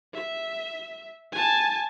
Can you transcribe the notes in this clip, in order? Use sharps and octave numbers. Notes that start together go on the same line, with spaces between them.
E5
G#5 A5